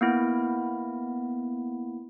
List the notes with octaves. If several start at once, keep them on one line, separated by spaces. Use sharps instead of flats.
A#3 B3 E4